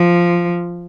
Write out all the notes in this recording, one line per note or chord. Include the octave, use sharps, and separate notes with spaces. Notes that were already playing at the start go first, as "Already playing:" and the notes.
Already playing: F3